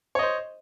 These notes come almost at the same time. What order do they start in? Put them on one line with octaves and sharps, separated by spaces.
C#5 D#5 C5